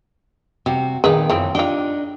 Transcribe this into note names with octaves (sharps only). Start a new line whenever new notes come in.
C3 G3 F#4
A#2 D#3 D#4 G#4 B4
F#2 D3 E3 F3 C4
D4 D#4 F4 G4